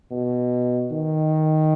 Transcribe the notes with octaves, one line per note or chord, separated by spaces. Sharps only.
B2
D#3